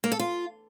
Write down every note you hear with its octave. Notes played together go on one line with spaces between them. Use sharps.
A#3
A4
F4